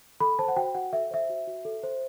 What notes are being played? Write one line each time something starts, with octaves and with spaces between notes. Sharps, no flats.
A4 B5
C5 A5
F#5
F#4 G5
F#4 F#5
A4 E5
C5 E5
F#4
F#4
A4
C5